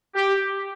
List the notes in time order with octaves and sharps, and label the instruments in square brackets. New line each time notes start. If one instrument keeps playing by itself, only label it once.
[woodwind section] G4